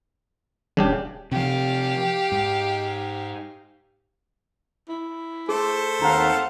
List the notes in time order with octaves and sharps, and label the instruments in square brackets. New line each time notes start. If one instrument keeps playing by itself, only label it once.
[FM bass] D#1 [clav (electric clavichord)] C#3 D4 G4
[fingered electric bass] C3 F3 [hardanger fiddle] G4 F5
[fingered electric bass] G#2
[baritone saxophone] E4
[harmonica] A3 A4 C5 [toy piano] G#4
[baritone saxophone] D#2 [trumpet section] C4 F5 F#5 [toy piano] D#4 A#5